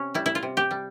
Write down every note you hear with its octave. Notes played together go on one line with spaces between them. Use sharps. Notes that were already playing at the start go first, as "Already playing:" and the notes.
Already playing: C3 C#4
G3 E4
E4
F4
C3
G4
G3